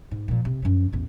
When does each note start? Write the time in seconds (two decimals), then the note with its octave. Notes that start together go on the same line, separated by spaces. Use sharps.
0.11 G#2
0.28 A#2 F3
0.45 C3
0.62 F#2 F3
0.92 A1 E2